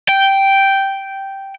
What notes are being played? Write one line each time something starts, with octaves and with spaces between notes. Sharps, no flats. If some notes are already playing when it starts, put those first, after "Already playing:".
G5